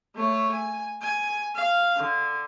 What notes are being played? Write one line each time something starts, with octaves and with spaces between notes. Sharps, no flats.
A3 C#5
G#5
G#5
F5
D3